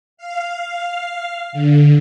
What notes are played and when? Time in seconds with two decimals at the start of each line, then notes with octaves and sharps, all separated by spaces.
0.17 F5
1.52 D3